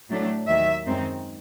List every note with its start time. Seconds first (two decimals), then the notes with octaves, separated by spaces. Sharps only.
0.10 A2 F#3 A3 D4
0.48 D#2 D#3 F#3 E5
0.86 F#2 D#3 G#3 C4 D#4